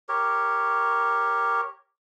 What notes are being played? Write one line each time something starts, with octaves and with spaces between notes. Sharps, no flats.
G4 A#4 C#5